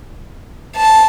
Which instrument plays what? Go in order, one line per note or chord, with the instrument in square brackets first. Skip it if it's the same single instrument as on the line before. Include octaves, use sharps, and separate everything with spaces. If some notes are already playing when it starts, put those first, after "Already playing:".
[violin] A5